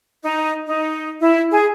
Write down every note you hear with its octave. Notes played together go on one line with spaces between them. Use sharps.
D#4
D#4
E4
G#4